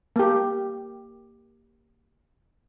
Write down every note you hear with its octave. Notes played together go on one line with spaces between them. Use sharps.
A#3 G4